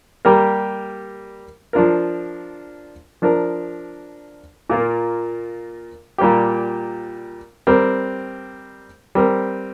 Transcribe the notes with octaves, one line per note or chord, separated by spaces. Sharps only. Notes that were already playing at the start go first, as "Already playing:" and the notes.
G3 A#3 G4 A#4
F3 D4 F4 A#4
F3 D4 A#4
A#2 A#3 F4 A#4
A#2 G3 A#3 G4
G3 C4 A#4
G3 C4 A#4